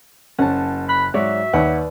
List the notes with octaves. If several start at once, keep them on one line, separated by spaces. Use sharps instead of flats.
F#1 C#4 F#5 A5
B5 F#6
G#2 F#3 F#4 C#5 D5 E5
D#2 B4 C#5 D5 F#5